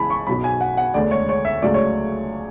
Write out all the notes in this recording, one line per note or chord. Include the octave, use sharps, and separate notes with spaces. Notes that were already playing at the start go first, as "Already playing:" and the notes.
Already playing: C#2 C#3 E3 G#5 A5 B5
C#6
B1 B2 F#3 B5
G#5
F#5
F#5
E1 D2 D3 G#3 D5
C#5
C#5
E5
C#2 C#3 F#3 A3 D5
C#5